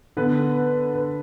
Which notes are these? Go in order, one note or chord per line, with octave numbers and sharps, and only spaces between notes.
D3 B3 B4
B4